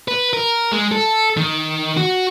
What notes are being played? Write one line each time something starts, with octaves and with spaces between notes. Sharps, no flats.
B4
A#4
G#3
A4
D#3
F#4